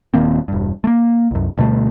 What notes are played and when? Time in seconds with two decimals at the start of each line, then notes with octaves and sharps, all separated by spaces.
0.14 D#1 D#3 A#3 C4
0.48 E1 G2
0.84 A3 A#3
1.31 C2 F#2
1.58 D2 B2 G3 A3